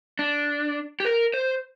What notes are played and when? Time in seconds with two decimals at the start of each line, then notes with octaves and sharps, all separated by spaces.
0.19 D4
1.00 G4
1.05 A#4
1.34 C5